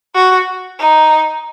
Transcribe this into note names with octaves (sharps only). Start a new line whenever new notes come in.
F#4
D#4